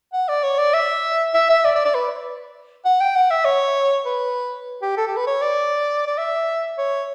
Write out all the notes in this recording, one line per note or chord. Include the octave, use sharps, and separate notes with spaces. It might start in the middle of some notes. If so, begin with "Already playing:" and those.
F#5
D5
C#5
D5
E5
E5
E5
D5
D5
D5
B4
F#5
G5
F#5
E5
C#5
B4
G4
A4
G4
B4
C#5
D5
D5
E5
C#5